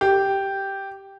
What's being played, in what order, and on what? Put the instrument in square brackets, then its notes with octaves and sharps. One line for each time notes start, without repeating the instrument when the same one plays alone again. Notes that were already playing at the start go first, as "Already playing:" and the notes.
[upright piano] G4